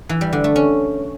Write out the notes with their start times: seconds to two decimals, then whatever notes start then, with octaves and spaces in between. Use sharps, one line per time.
0.09 E3
0.21 G3
0.33 D3
0.44 A3
0.56 C#4